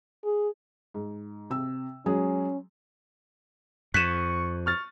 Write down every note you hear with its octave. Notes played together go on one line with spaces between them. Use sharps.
G#4
G#2
C3 E6
F#3 G#3 C#4 G#4
F2 C#6 F#6 B6 C#7 D#7 E7
C#6 F6 A6